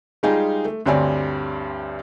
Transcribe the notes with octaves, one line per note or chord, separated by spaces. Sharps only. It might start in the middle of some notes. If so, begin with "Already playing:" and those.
G3 G#3 D#4 F4 G4 G#4
A3
D2 G2 C4 C#5 D5 G#5